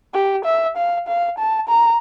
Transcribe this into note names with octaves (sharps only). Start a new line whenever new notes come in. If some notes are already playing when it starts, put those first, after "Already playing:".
G4
E5
F5
F5
A5
A#5